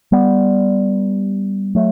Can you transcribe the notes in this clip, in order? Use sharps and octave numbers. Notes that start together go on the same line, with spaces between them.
G3 B3
F#3 A3